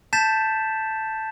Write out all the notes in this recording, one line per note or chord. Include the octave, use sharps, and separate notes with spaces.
A5 G6 A6 B6 E7